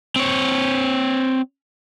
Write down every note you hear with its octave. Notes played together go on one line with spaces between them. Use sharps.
C4 C#5